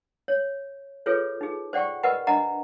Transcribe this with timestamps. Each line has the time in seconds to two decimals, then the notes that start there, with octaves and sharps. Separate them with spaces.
0.28 C#5
1.06 F4 G#4 A4 B4 C#5
1.41 D#4 G#4
1.73 C5 D5 F#5 G5 C#6
2.03 A#4 B4 D#5 F#5 B5
2.27 D4 D#5 F#5 A#5 B5